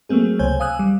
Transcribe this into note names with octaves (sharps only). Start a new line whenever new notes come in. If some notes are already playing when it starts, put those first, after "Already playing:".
F#3 A3 A#3 C4 G#4
C#2 C3 C5 C#5 G#5 G6
F5 G#5 D#6 E6 F#6
G3